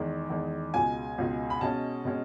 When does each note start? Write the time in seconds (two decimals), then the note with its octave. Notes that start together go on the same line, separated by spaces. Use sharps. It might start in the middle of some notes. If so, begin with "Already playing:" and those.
Already playing: E2 D#3 G#3
0.30 E2 D#3 G#3
0.74 C#2 B2 G#3 G#5
1.18 C#2 B2 G#3
1.50 B5
1.61 B2 G#3 C#4 A5
2.05 B2 G#3 C#4